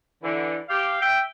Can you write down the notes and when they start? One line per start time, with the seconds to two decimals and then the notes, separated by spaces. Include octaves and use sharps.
0.23 D3 E3
0.69 G4 F5
1.00 E5 G5